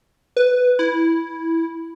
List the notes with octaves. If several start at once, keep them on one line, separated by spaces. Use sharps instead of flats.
B4
E4